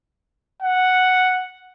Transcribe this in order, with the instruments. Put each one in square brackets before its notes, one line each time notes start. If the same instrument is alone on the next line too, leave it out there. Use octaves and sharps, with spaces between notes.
[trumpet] F#5